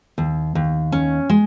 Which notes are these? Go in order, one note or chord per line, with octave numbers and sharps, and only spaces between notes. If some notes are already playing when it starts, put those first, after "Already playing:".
D#2
D#2
C#4
G#3